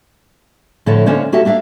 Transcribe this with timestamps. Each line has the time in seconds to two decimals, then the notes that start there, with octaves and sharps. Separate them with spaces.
0.86 A2 D3 F3 E4 A4 C#5
1.06 D3 A#3 C#4 D4 C5 C#5
1.32 A#3 F#4 G4 A4 E5 A5
1.45 A#3 D4 E5 F5